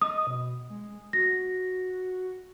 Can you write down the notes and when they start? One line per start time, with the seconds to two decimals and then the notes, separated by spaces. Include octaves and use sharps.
0.01 D#5 D#6
0.27 B2
0.70 G#3
1.13 F#4 A#6